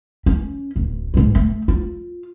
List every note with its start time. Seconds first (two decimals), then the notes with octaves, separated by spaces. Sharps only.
0.26 C#4
0.76 D1
1.14 G#2 G#3
1.35 A3
1.68 F4